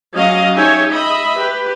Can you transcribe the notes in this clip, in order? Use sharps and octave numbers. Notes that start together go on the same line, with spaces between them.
F#3 C#4 D#5 F5
D#4 G4 C#5 E5 G#5
D#5 E5 B5
G4 B4